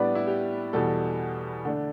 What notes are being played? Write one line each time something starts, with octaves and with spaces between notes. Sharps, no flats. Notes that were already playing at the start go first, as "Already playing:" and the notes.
Already playing: A2 G3 B3 D4 B4 D5
E4
G4
E2 B2 G3 A4
D3 A3 D4